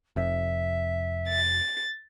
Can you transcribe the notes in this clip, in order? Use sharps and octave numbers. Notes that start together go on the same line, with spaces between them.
F1 F2 E5
A6